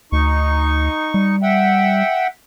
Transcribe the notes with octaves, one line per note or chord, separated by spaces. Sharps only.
D2 D#4 C#6
G3
E5 F#5 G5